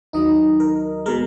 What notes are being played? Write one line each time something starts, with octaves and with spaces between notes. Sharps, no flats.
D#2 D#3 F#3 D#4 D#5
A#4
B2 G#3 A#4